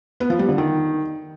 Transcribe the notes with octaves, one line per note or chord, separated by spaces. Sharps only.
B3
F3
G3
D3
D#3